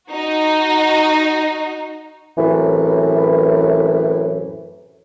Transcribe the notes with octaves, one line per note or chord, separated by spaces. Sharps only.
D#4 F#4
F#2 A2 C3 E3